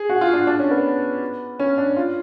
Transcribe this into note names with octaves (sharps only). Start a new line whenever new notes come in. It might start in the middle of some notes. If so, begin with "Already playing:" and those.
Already playing: G#4
F#4
F4
D4
D4
C#4
B3
C#4
D4
F4